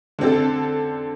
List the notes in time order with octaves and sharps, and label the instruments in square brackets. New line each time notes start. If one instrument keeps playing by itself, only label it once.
[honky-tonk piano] D3 C4 A4